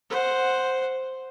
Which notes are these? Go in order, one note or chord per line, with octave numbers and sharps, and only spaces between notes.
C5 F#5